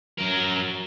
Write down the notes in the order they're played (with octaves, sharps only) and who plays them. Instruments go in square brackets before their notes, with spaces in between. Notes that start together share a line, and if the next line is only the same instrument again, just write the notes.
[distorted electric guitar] F#3 A#4